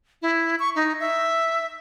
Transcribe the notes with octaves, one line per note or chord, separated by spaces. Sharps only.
E4
C#6
D#4
E5